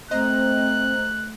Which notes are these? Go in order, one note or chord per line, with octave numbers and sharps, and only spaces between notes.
A3 C4 C5 D#5 A#5 F#6